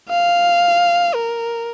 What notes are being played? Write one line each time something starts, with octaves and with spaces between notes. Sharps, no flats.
F5
A#4